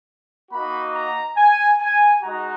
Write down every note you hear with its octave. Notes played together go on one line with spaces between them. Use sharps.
A#3 D#4 F#4 B5
A#5
G#5
G#5
G#3 D#4 F#4 A#5